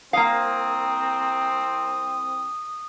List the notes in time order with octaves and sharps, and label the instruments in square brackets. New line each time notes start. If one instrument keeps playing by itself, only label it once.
[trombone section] C2 C4 [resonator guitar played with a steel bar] A#3 F5 [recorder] D#6